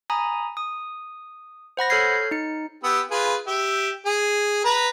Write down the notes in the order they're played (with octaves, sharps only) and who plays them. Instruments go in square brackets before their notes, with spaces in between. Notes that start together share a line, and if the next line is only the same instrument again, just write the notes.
[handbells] G#5 A#5 B5 D#6
D#6
C5 F#5 B5 A#6
A4 C#5 F6 G6 G#6 C7
D#4 C#7
[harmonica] B3 G4 E6
F4 G#4 B4
G4 E5
G#4
B4 A#5